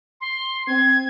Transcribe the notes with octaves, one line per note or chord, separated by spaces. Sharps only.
C6
C4 G#6